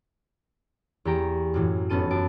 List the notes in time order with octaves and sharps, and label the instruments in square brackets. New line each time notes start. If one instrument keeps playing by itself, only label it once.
[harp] E2 A#3 G4 A#5 C#6 D7
F#2 A2 E3
F1 B3 C#4 A4 D#7
F#2 A5 D7